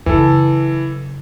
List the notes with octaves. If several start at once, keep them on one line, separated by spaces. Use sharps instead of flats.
F#2 C#3 E3 A4